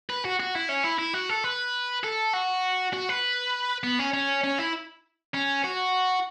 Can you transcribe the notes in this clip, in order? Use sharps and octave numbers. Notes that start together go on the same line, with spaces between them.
B4
F#4
F#4
E4
C#4
E4
E4
F#4
A4
B4
A4
F#4
F#4
B4
B3
C#4
C#4
C#4
E4
C#4
F#4